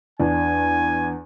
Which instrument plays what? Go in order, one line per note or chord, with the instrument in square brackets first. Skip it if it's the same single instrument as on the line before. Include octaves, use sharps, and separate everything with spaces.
[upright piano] E2 D4 [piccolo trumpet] G#5